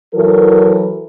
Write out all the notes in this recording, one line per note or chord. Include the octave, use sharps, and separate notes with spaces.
E3 F#3 E4 A4 A#4